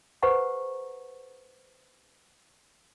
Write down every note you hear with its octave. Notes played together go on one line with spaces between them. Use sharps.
G#4 B4 C5 F#5 A#5 C#6